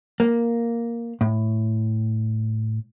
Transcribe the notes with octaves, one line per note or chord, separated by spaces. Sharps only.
A#3
A2